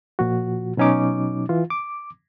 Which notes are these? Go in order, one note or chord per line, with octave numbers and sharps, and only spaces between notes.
A#2 F3 F#4
B2 F#3 C#4 D#4 D6
E3 F4
D6